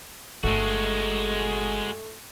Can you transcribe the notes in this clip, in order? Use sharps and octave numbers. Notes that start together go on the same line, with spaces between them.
G1 G#3 A3 F#4